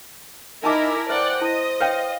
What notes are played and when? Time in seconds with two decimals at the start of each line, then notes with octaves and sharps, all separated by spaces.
0.64 D#4 E4 A#4 G#5 A5 D6
1.09 B4 C5 D5 E5 F#5 G5
1.41 E4 D#5
1.80 B4 C#5 F5 G5